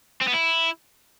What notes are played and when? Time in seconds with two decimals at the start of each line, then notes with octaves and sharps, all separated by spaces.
0.22 C4
0.28 B3
0.34 E4